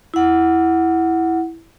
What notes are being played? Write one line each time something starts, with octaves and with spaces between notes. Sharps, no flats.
E4 F#5